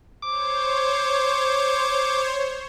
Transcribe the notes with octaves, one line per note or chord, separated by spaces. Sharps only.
C5 C#5 D6